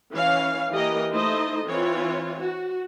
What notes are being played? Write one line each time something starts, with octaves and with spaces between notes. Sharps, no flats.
E3 C#4 C#5 F5
E3 A#3 G4 A#4 D#5
A3 D#4 E4 A4 C5 D#5
E3 C4 F4 C#5
F#4